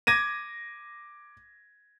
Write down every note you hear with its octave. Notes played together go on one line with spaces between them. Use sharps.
D6 G#6 A#6 D#7